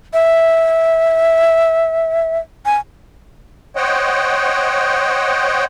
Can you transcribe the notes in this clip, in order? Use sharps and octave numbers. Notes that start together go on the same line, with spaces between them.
E5
G#5
C5 C#5 D#5 F#5 G5